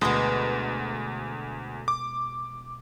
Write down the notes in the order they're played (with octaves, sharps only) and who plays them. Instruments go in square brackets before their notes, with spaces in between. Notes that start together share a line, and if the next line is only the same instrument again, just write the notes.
[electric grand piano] D2 [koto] B2 G#3
[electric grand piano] D6